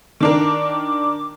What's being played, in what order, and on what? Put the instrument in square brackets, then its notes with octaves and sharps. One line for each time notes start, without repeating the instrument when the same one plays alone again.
[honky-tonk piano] D#3 D4 A#4 [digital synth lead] D6